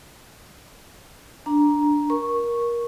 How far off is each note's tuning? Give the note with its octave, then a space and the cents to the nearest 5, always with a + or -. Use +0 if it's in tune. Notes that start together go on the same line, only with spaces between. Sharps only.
D4 +0 A#5 +10
A#4 +20 C#6 -5